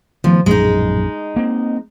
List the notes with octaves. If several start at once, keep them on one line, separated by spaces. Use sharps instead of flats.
D#3 F3 A3 B3
A#1 F#2 A2 G#3 D#4
A#3 C4